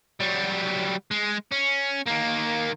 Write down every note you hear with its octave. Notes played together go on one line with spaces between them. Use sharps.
F#3 G3
G#3
C#4
D#3 A#3